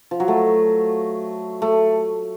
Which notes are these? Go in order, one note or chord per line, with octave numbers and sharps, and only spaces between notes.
F3
F#3
A3
A3